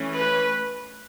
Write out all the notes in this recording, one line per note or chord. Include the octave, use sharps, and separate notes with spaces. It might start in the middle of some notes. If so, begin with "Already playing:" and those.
Already playing: E3 A3 C#4
B4